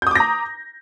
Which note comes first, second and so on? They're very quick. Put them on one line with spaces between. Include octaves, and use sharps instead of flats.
G6 D#6 D6 A#6 A#5